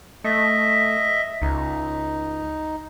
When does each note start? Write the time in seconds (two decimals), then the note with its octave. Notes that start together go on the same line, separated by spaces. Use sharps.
0.24 A3 D#5 E5
1.42 C#2 D#4